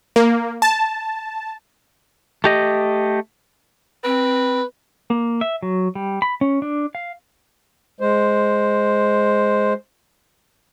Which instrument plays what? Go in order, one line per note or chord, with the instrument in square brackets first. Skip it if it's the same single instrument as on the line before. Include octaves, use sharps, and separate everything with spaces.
[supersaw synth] A#3
A5
[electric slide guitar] A3 G4 D#5
[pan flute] C4 [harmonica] B4
[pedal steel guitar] A#3
E5
F#3
G3
B5
C#4
D4
F5
[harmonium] G#3 C5